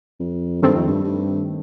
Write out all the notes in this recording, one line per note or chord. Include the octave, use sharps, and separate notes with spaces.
F2
G2 D#3 A3 C4
F2
G2
G2